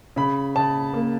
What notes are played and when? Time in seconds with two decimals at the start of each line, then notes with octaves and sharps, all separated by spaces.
0.16 C#3 B5
0.56 C#3 A5
0.94 A#3